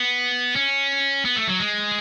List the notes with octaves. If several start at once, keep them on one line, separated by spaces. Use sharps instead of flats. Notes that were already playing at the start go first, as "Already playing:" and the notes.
Already playing: B3
C#4
B3
A3
F#3
G#3